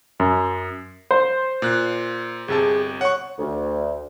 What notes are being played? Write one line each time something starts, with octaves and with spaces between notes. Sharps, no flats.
F#2
C5
A#2 F#6
G1 C3 G#4 A5
C#5 F#5 C#6
D2